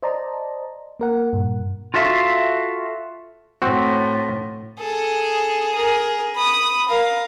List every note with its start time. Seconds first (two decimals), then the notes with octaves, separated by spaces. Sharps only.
0.03 C5 D5 D#5 A5 A#5
1.00 A#3 A#4 F#5
1.33 G2 A#2
1.94 F4 F#4 A4 E5 F5
3.62 A2 C4 F#4
4.79 G#4 A4
5.75 G#4 A#4
6.36 B5 D#6
6.89 A#4 F5